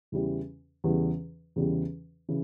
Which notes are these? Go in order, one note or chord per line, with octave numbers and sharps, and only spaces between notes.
E2 C#3 E3 G3
E2 C#3 E3 G3
E2 C#3 E3 G3
C#3 E3